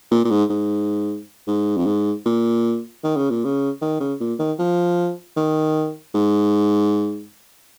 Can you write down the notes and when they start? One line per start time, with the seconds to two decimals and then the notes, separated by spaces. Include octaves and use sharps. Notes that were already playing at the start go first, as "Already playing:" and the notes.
0.11 A#2
0.25 A#2
0.30 G#2
0.50 G#2
1.47 G#2
1.77 F2
1.86 G#2
2.25 A#2
3.04 D#3
3.17 C#3
3.30 A#2
3.44 C#3
3.81 D#3
4.00 C#3
4.20 A#2
4.39 D#3
4.59 F3
5.36 D#3
6.14 G#2